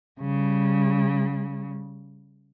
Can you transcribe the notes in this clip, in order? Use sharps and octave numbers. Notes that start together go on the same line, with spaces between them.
C#3 G3